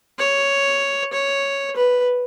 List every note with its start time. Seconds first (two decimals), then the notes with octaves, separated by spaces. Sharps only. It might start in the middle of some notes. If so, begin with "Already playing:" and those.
0.19 C#5
1.13 C#5
1.76 B4